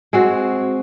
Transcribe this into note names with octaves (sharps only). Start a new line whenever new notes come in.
G#3 C4 F#4